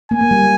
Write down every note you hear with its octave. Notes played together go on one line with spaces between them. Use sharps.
A#3 G#5
A#3
G3